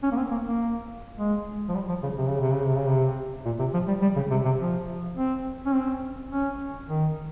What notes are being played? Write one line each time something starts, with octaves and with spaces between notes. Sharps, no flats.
C#4
A#3
C4
A#3
A#3
G#3
F3
G3
F3
C#3
C3
C#3
C3
C#3
C3
C#3
C3
A#2
C3
F3
G3
G3
C#3
C3
C3
F3
C4
C#4
C4
C#4
D#3